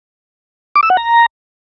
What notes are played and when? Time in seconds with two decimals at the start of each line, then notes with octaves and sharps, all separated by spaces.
0.76 D6
0.83 E6
0.90 F#5
0.97 A#5